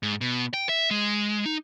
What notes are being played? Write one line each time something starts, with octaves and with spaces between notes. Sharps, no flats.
G#2
B2
G5
E5
G#3
D#4